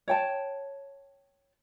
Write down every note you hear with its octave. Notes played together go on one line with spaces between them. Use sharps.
C#5 G5 A5